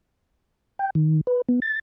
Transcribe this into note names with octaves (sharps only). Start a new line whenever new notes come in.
G5
D#3
B4
B3
A6